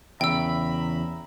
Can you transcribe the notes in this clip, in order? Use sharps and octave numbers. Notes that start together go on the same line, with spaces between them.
E2 C#3 E5 G5 A#5 B5 E6